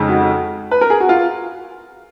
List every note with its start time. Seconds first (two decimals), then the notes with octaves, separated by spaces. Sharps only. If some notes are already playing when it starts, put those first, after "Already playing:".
Already playing: F2 C#3 G#3 D#4
0.09 F#4
0.71 B4
0.81 A#4
0.90 G#4
1.00 F#4
1.09 F4